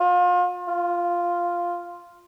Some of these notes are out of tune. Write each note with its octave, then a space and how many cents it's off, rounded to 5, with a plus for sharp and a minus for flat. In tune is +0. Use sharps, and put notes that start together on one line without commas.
F4 +35
F4 +0